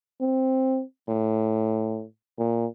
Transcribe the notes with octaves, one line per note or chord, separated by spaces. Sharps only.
C4
A2
A#2